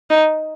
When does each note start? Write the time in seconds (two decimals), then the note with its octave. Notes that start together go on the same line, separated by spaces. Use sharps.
0.10 D#4